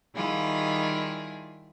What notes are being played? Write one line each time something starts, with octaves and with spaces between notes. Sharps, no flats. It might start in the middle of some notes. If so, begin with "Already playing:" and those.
D#3 G3 E4 F4 G#4